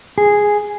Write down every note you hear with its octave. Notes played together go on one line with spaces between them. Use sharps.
G#4